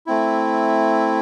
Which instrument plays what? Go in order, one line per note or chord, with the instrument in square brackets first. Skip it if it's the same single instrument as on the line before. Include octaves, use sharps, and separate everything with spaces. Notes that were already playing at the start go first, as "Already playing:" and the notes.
[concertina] A3 C4 E4